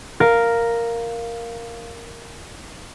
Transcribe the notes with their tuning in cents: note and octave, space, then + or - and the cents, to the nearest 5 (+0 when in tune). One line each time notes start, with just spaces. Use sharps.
A#4 +0 F5 +0